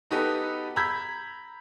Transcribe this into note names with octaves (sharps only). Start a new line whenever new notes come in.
B3 D#4 F#4 G4 A4 B4
A#5 B5 E6 G6 G#6 B6